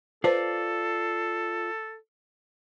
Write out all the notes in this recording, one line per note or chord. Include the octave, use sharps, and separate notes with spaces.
F4 A4 B4 C5 D5 A5